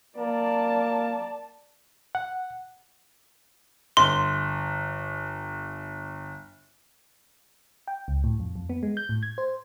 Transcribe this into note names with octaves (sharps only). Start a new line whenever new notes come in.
A#3 D5 A5
F#5
G1 C6
G5
C#2
A2
F2
F2
B3
G#3
G6
A2
G#6
C5